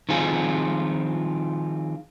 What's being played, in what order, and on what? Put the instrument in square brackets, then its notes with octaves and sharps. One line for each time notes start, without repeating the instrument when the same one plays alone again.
[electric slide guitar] D#3 F3 C4 F4 G#4